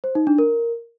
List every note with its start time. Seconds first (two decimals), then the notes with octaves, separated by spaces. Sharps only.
0.04 C5
0.15 D#4
0.27 D4
0.38 A#4